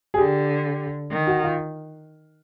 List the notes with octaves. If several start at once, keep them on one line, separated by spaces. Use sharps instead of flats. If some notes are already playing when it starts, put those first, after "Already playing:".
G#4
D3 G4
D#3
F#4
F4